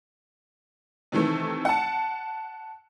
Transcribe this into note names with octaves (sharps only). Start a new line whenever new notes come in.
C3 D#3 E3 A3
F#5 A5